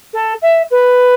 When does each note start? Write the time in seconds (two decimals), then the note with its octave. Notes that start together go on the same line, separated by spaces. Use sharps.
0.13 A4
0.42 E5
0.71 B4